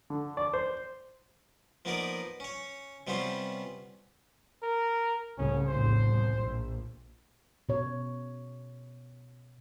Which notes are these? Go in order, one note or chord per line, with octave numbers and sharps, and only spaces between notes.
D3
D5
C5
F3 A#3 B3 D#4 A#4 D5
C#4 C#5
C3 G3 B3 C#4 F4 C5
A#4
C2 A2 C#3 C#4
A#1 E2 A2 C5
C2
A#1
B2 C#5